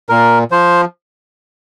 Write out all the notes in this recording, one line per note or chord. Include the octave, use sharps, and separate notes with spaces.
A#2 A#4
F3 C5